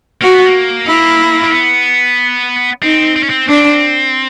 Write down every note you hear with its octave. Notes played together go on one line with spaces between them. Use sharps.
A#3 F#4
B3
A#3
E4
A#3
B3
C4 D#4
C4
C#4
C4
C4 D4